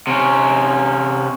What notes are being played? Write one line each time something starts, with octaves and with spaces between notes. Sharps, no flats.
C3 C#4